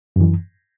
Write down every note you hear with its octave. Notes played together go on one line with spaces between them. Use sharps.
F#2 E3